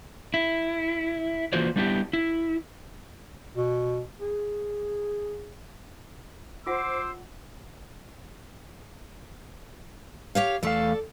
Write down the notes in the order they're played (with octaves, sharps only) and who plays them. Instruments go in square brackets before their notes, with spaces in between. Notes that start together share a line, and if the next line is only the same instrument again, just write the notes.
[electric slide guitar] E4
E3 A#3 F4 F#4 C5 D5
G3 B3 D4 E4 G4
E4
[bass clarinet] B2
G#4
[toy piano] F4 F#5 [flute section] C5 [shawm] D6 [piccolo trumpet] E6
[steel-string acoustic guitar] G4 C#5 F5
[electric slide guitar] E2 A3 F5 [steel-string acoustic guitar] A4 D5